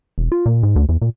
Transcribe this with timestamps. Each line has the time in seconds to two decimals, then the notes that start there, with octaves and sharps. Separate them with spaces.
0.18 E1
0.32 F4
0.46 A#2
0.63 G#2
0.76 D2
0.89 E2
1.02 A#2